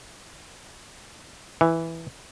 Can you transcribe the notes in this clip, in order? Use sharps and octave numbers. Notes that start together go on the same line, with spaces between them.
E3